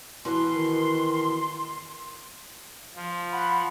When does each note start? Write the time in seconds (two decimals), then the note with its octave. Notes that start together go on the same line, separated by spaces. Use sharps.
0.25 B2 E3 F#4 C6
0.53 D#3
2.95 F3
3.33 F#5 B5